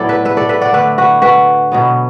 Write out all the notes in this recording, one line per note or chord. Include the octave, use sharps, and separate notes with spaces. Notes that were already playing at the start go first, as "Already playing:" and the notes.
Already playing: A2 F#3 B3 E4 A4 D5
B4 E5
B4 E5
A4 D5
B4 E5
D5 F#5
D3 A3 B4 E5
F#4 B4
F#4 B4
B2 F#3 B3